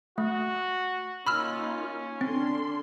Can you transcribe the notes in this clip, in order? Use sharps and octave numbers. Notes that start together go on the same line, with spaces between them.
A3 F#4
A#3 C#4 D#4 F4 B5 E6 F6
D3 C4 D4 C6